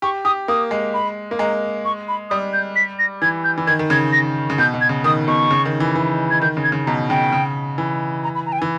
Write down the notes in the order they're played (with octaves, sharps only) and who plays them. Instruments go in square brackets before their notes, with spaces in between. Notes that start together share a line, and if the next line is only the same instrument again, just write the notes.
[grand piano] G4 [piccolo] C#6
[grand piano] G4 [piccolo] D#6
[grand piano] A#3 [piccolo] D#6
[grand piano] G#3
[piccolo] B5
[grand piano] A#3
[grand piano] G#3 [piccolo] A#5
[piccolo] C#6
B5
[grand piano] G3 [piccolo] D#6
[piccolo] G6
B6
A#6
[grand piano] E3 [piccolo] G#6
[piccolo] G6
[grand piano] E3
[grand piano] D#3 [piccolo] G#6
[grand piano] D#3
[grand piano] C#3 [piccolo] G#6
[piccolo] A#6
[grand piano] C#3
[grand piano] B2 [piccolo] G6
[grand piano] B2
[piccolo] G#6
[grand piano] C#3
[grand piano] D#3 [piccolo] D#6
[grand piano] B2 [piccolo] C#6
[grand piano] C#3
D#3
E3
E3
[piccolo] G#6
[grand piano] D#3 [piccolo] G6
[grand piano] C#3
[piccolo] G#6
[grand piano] C#3
[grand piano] B2 [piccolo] A#5
[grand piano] C#3 [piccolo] G5
[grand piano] C#3
E3
[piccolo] A#5
B5
A#5
G5
G#5
[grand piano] E3